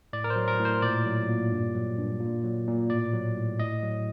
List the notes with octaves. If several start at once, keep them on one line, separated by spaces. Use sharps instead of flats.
A2 D5
A#4
C5
F#3
A#4
A2
C5
A#2 D5
F#3
A#2
G2
F#3
G2
A#2
F#3
A#2
A2 D5
F#3
A2
A2 D#5
F#3